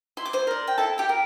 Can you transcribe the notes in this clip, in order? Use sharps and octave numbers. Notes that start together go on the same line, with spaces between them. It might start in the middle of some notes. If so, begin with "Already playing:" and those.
E4 C6
D6
C5 C6
A#4 D5
G5
E4 A4 A5
G4 G5
A#4